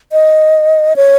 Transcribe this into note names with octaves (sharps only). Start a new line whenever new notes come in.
D#5
C#5